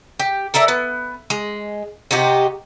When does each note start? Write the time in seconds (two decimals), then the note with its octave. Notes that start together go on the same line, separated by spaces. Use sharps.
0.20 G4
0.54 A4 A#4 D5 E5
0.68 B3
1.30 G#3
2.11 C3 D#4 F#4 G4